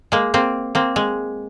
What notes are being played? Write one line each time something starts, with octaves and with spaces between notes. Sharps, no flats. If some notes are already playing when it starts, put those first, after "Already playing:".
G#3 A#3
A#3 C4
A#3 C4
G#3